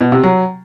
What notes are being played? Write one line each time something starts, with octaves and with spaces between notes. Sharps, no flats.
B2
C3
F#3